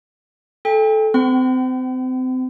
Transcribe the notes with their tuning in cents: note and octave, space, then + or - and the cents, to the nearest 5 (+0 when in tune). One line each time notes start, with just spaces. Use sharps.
A4 -15 G5 +35
C4 -30 G5 -35 B5 +45